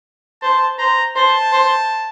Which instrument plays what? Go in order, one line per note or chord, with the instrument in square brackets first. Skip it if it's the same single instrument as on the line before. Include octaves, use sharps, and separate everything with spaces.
[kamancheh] C5 [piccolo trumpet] A5
[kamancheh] C5 [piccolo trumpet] A#5
[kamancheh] C5 [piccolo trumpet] A5
[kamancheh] C5